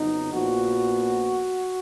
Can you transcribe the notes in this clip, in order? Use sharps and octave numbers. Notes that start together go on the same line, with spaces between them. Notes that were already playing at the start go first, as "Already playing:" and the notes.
Already playing: F2 C#3 F#3 B3 D#4
A#1 A#2 F3 B3 F#4